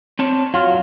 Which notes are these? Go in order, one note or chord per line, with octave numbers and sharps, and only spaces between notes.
C4 C#5 A5
F#3 F4